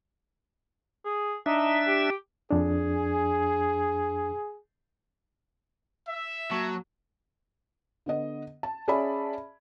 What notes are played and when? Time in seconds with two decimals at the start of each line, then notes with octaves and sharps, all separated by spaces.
1.05 G#4
1.46 D4 D#4 E5
1.87 G4
2.51 F2 D4 G#4
6.08 E5
6.51 F#3 A#3 A5 C#6
8.06 D3 B3 D#5
8.63 A5
8.88 C#4 G#4 D5 E5 A5 B5